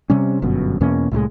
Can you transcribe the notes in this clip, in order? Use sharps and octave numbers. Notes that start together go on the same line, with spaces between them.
C3 G3 C#4
G1 F#2 B2
E2 B2 A#3 C#4
C2 A2 F3 G#3